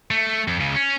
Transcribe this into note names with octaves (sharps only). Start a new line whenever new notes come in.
A3
F2
C#2 C#3
C#4